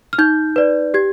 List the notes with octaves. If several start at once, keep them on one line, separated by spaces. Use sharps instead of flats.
F6
D#4 G6
B4 D5
G4 G#6